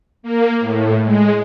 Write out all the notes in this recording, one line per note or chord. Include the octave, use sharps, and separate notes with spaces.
A#3
A2
G#3